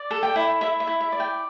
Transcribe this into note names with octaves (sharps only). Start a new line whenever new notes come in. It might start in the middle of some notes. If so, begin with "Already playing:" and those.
Already playing: D5
A4
G5
E4
E4 E5
E5
E4
E5
D5
G5